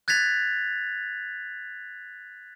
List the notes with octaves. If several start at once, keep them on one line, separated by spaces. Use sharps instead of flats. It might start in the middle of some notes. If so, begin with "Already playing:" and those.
F#6 G#6 A6 B6 F7